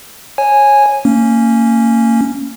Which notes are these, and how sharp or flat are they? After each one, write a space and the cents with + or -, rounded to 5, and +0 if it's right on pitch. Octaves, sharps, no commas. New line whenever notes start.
C#5 -20 G#5 +0
A#3 -30 C#4 +0